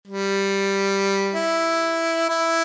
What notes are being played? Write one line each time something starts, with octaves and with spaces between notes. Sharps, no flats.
G3
E4
E4